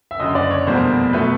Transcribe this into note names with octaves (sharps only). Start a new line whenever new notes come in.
E5
F#1 F#2 D3 D#5
D5
C#5
F1 E2 B2 G3 A#3 C5
B2 F#3 A3 B4